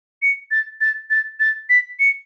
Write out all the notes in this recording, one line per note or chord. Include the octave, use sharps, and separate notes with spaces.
C#7
A6
A6
A6
A6
B6
C#7